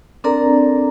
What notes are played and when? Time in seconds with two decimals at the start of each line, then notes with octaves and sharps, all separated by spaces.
0.24 C4 D4 A4 A#4 D5 A#5